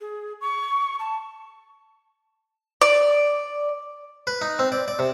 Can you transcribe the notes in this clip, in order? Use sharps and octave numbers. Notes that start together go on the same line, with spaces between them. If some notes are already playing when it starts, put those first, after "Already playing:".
G#4
C#6
A5
D5
B4
D#4
C4
D5
D5
C3